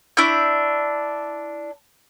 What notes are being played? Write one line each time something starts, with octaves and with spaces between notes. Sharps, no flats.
D4 E4 C#6 G6